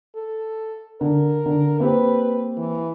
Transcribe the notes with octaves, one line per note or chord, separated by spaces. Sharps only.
A4
D3 A#4
D3
A#3 C4 G4 B4
E3